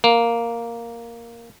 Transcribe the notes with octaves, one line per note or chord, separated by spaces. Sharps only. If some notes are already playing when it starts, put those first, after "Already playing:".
A#3